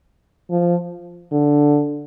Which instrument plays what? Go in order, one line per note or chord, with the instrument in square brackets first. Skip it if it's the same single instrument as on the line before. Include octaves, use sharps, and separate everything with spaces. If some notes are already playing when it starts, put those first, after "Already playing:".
[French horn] F3
D3